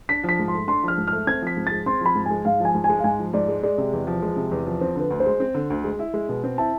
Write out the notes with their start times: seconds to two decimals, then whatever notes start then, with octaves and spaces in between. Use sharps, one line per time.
0.09 D4 B6
0.24 F3
0.29 B6
0.39 G#2
0.48 C6
0.53 A3
0.68 D4 C6
0.83 F3 F6
0.98 G#2
1.07 A3 F6
1.27 C4 G#6
1.42 F3 B6
1.57 G#2
1.67 G#3 A6
1.86 C4 C6
2.01 F3 B5
2.15 G#2
2.26 G#3 G#5
2.45 G#2 F5
2.60 F3 G#5
2.75 G#2
2.84 G#5
2.89 G#3
2.99 F5
3.04 G#2 G#5
3.19 F3
3.33 G#2 D5
3.48 G#3
3.63 G#3 D5
3.78 C3
3.93 E2
4.07 F3
4.22 G#3
4.36 C3
4.51 E2
4.66 F3
4.81 C4 C5
4.96 D3 B4
5.10 D2
5.20 C5
5.26 G#3
5.40 C4
5.55 D3
5.70 D2
5.84 G#3
5.99 E4
6.14 G#3
6.29 B2
6.44 C4
6.58 E4 A5